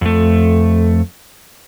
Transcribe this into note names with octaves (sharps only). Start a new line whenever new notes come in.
F2 A3